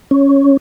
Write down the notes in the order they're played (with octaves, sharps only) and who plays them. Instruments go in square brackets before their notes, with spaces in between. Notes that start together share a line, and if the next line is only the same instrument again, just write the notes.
[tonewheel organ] C#4